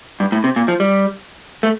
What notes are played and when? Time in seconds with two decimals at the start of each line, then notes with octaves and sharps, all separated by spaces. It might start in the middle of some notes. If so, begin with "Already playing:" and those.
0.20 G2
0.32 A2
0.44 C3
0.56 A#2
0.68 F3
0.80 G3
1.63 A3